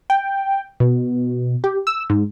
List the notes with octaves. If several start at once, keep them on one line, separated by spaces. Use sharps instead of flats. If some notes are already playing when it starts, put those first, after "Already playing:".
G5
B2
G4
E6
G#2